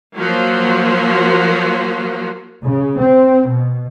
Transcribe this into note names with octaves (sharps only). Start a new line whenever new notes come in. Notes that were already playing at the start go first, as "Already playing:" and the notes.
F3 F#3 A#3 F4 F#4
C#3
C4
B2